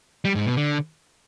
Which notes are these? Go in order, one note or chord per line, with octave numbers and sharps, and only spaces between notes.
G3
G#2
B2
D3